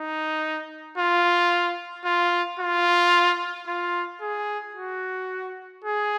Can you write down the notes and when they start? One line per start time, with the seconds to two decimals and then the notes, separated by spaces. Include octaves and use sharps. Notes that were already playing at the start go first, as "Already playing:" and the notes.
Already playing: D#4
0.98 F4
2.05 F4
2.60 F4
3.67 F4
4.21 G#4
4.75 F#4
5.84 G#4